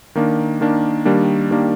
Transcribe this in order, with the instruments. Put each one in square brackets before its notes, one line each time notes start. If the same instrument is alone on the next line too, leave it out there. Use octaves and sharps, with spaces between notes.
[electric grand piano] D#3 A#3 D4
D#3 A#3 D4
D#3 G3 A#3 D4
D#3 G3 A#3 D4